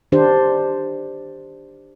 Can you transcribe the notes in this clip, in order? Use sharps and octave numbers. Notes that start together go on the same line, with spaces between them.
D#3 D4 G4 C5